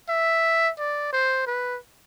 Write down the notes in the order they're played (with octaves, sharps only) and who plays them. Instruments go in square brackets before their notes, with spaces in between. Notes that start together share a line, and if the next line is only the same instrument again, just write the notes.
[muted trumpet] E5
D5
C5
B4